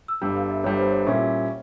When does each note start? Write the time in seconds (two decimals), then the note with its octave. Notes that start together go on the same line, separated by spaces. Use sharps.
0.08 E6
0.22 G1 G2 G3 E6
0.36 F5
0.50 E5
0.64 G1 G2 G3 C#5
0.78 C5
0.92 C#5
1.06 A#2 G3 C#4 E4 E5